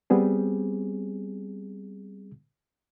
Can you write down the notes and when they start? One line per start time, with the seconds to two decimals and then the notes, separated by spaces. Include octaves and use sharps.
0.10 G3 B3 C4 G#4